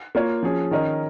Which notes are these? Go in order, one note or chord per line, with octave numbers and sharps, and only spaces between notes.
A#3 F4 C#5
F3 C#4 G#4
D#3 C#4 A#4 D#5